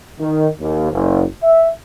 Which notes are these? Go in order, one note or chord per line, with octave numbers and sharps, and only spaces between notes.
D#3
D#2
F#1
E5